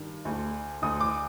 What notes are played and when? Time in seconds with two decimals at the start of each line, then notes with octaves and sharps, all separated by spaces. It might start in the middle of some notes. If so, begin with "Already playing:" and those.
Already playing: G2 D#3
0.25 D2 D3
0.82 D2 D3 D#6
1.00 D6